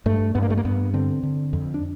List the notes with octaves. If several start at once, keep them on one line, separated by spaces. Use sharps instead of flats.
G2 A3
G2 B3
A#3
A3
A#3
G2 B3
D3 C4
D3
F2
D4